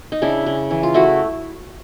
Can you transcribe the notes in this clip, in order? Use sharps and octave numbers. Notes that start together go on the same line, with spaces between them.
D#4
C#3 D4 E4
C#3
E3
F4
A3 E4 F#4